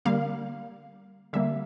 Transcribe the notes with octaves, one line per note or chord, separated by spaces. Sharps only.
D3 G3 A#3 F5
D3 G3 A#3 E5